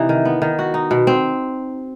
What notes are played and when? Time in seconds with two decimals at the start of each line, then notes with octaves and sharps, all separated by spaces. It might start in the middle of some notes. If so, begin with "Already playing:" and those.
Already playing: C3 E3 D#4
0.09 D#3
0.25 B3
0.42 D#3
0.59 F#4
0.74 D#4
0.91 B2
1.07 C4